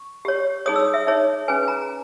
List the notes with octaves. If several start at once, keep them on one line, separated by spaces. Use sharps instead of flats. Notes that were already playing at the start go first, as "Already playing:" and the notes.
Already playing: C#6
G4 C#5
D#4 G#4 C#5 D#6
E6
D#6
E5
D#4 G#4 C#5
C#4 G#4 B4 G#5
G#5
A#5